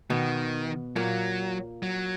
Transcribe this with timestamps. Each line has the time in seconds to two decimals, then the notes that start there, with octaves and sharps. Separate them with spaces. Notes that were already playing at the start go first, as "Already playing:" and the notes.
0.10 B2 D#3 B3
0.96 A#2 F#3 A#3
1.83 F#3